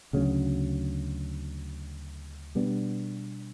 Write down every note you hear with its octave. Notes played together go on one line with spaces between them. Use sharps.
D2 C#3 F#3
B2 G3 B3 D4